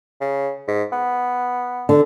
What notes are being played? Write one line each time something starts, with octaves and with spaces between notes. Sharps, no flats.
C#3
G#2
B3
D3